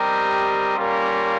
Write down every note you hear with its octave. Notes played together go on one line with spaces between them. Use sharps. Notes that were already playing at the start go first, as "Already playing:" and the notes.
Already playing: G3 C4 G4 A#4 D#5
G3 A#3 C#4 F4 A#4